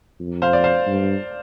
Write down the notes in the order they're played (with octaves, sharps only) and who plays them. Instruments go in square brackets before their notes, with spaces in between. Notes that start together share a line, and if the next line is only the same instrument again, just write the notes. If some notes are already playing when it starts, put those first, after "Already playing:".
[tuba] F2
[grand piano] C5 F5
D5
C5 F5
[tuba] G2